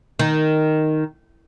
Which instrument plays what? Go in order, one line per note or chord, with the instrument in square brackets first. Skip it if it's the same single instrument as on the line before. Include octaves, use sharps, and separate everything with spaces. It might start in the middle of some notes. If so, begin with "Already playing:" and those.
[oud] D#3